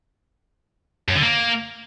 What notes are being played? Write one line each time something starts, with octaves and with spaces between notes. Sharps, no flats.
F#2
D3
A#3